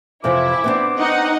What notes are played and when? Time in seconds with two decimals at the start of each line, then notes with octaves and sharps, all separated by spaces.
0.24 F2 C3 E3 E4 D6
0.64 B3 C4 D4
0.98 D#4 D#5 F#5